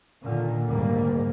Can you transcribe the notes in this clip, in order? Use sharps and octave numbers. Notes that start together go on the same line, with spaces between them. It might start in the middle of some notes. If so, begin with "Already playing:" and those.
A#2 D3 D#3
D2 G#2 G3 A#3